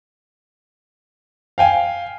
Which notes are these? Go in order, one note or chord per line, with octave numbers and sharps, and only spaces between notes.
F5 G5 G#5